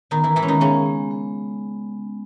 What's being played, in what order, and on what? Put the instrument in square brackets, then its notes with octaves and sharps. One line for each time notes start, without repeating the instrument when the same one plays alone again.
[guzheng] D#3 D#4 [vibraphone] B3
[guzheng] E3 E4
[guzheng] E3 E4 [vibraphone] G#3
[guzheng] C#4
D#3 D#4
[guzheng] C#3 C#4 [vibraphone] B3
[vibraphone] G#3
G#3